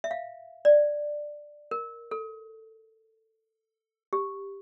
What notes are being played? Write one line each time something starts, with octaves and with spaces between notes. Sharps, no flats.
E5
F5
D5
A#4
A4
G4